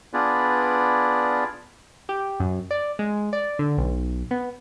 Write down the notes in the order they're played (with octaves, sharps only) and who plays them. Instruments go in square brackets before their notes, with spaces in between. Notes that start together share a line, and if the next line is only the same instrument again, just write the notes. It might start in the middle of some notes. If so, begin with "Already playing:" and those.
[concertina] B3 D4 F4 G#4 B4 D5
[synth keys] G4
F#2
D5
G#3
D5
D3
B1
B3